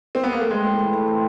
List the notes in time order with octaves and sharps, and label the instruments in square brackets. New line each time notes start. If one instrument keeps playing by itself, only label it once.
[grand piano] C4
B3
A#3
A3
[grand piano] G#3 [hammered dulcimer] C4
[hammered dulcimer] A2
E3
A3
C4